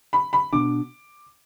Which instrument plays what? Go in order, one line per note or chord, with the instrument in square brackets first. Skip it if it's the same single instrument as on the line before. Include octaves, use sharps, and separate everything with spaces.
[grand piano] B5
B5
[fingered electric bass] B2 B3 D4 [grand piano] D6